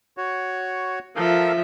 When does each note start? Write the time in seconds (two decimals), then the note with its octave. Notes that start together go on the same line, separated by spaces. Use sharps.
0.17 F#4 C#5
1.16 F3 A4 A#4 E5 F5